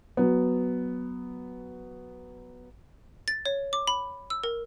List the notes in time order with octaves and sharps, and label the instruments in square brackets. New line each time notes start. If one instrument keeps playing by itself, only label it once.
[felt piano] F#3 B3
[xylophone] A6
C#5
D6
B5
E6
A#4